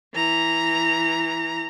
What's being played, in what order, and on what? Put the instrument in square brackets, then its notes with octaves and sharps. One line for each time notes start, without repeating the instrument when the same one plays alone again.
[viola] E3 A#5